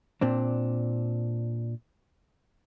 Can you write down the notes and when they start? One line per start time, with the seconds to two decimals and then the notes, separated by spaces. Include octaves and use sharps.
0.21 A#2 C4 D4